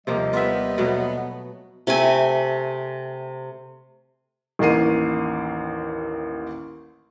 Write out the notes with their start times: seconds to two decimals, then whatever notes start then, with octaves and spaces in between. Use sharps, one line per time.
0.07 D#2 C3 F3 G3 A#3 D#5
0.33 B3 F4 E5
0.78 B2 F#3 A3
1.87 C3 A3 C4 G#5
4.59 A1 D#2 A#3 C7 D#7